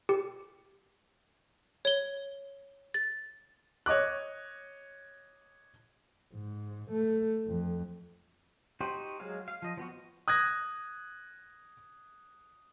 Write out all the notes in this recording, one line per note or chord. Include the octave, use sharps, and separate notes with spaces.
G4
C#5 G7
A6
C#5 D#5 D6 F#6
G#2
A3
F2
D#4 F#4 G4 C5
F#3 G#3 G#4 F5
F5
F3 D#5
F3 B3 F#4
D#6 F#6 G#6 A#6